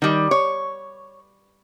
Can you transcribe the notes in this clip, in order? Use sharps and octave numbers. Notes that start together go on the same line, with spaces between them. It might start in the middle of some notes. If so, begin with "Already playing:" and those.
D#3 G3
C#5